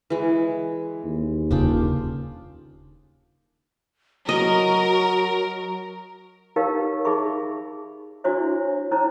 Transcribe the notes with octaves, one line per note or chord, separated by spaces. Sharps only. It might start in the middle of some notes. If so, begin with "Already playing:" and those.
E3 G#3
D#2
D#1 C#3 D4 F4 G5
F#3 F#4 A#4 D#5
D#4 G4 A#4 B4 C#5 F5
D#4 G#4 E5 B5 C#6
D4 E4 F#4 C5 C#5 E5
C#4 D#4 E4 C5 C#5 A#5